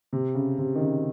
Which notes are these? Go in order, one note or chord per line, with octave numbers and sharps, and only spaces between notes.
C3
C#3
C3
D#3
C#3